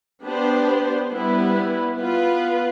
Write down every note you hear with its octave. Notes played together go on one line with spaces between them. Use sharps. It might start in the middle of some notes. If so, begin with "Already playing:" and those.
B3 D4 G4 C5
G3 B3 E4 B4
B3 F4 B4